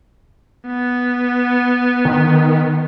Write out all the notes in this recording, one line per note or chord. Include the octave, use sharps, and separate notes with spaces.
B3
D#3